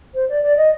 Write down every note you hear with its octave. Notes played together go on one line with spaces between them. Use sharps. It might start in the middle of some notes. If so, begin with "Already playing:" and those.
C5
D5
D5
D#5